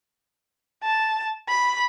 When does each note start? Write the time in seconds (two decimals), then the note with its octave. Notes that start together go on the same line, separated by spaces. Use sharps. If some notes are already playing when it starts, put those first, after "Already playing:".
0.84 A5
1.48 B5